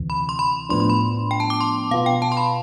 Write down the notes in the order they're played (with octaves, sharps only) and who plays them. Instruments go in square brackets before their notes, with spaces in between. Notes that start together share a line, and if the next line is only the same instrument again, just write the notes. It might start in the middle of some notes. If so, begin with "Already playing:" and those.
Already playing: [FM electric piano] D2 C3 E3
[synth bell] B5
C6
B5
[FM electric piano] A2 F3 B3 D4 [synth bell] C6
[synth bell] C6
B5
G5
A5
D6
C6
[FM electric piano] B2 B3 F4 [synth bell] F5
[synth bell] G5
A5
C6
B5